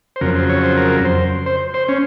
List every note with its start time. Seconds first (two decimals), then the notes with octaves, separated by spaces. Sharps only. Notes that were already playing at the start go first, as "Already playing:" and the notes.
0.16 C5
0.21 F2 C#3 F#3 A#4
0.35 C5
0.49 C#5
0.63 C5
0.77 A#4
1.05 C5
1.46 C5
1.74 C5
1.88 C#4